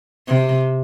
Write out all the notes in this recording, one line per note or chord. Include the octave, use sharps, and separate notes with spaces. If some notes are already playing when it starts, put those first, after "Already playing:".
C3